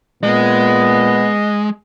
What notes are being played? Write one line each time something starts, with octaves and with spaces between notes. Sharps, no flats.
A#2 G#3 B3 D#5